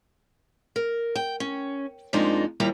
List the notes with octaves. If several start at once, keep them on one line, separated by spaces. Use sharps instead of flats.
A#4
G5
C#4
F2 F3 G#3 A#3 D4 D#4
D#2 G3 A#3 E4 F4 A#5